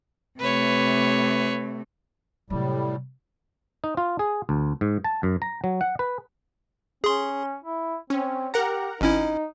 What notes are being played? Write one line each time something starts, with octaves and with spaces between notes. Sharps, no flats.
C3 A3 B4 C#5
A2 C3 F#3 G3
D#4
F4
G#4
D2
G#2
A5
F#2
A#5
F#3
F#5
B4
C#4 G#4 C6
E4
C4 C#4
G4 A#4 F#5 A#5
G#1 C#4 D#4 E4